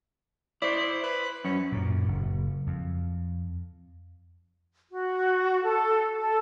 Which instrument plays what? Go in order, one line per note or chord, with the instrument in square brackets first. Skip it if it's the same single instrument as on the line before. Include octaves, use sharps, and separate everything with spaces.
[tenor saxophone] E4 [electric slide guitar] C5 D5
[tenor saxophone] B4
[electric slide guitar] F#2 [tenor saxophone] C#4
[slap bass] F#2 A#2
F#1
F2
[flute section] F#4
A4
A4